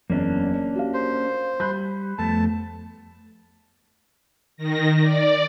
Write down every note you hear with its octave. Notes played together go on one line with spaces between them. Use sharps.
F#1 E2 A#3 C#4 D4
F#4 G4 F5
C5
G3 B5 F#6 G6
F2 A3 B3 A5
D#3 A#6
D5